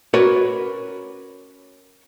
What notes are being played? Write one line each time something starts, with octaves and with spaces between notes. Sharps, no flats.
C#4 F#4 A#4 B4 C#5 D5